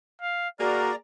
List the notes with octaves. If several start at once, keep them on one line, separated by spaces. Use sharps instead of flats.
F5
A#3 F#4 G#4 D5 A#5 F6